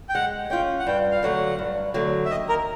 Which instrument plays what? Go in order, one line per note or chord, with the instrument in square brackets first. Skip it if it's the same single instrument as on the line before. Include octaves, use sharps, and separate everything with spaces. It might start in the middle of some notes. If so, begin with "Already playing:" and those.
[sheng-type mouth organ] G5
[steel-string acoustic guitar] G#3 [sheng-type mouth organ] F#5
[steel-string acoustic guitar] C#4 F4 [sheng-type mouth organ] G5
[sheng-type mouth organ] F#5
[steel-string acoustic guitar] G2 [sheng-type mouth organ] G5
[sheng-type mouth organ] F5
[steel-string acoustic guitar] D3 F#3 A3 [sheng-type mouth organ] F#5
[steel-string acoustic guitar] G2
D3 F#3 A3
[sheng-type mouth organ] E5
[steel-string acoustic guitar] D#2 [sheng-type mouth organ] D#5
[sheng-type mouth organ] A#4